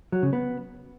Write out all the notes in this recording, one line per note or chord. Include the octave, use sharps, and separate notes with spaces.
F#3
C#3
B3